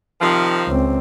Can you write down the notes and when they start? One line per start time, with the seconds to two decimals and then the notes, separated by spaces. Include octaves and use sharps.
0.21 C3 D#3 F3
0.67 C#2 C4